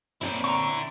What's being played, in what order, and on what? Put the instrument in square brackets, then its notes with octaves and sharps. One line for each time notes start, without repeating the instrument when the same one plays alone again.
[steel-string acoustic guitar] A#2 C4 C#5 [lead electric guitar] D4 E4
[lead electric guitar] D3 [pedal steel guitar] A#5 C#6
[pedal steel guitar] E4